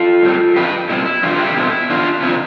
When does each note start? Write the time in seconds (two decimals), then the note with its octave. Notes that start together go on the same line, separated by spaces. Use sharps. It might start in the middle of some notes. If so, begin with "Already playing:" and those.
Already playing: F4 A4
0.23 A2 G3 C4
0.56 F2 D3 F3 G4 B4
0.89 B2 G3 C4 E4
1.06 E4
1.23 F2 C3 E3 D4 F4
1.39 E4 G4
1.56 B2 A3 C4
1.89 E2 B2 B3 D4 F4
2.22 C3 F3 C4 E4